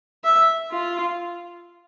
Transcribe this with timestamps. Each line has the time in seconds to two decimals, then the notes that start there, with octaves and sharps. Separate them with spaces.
0.24 E5
0.71 F4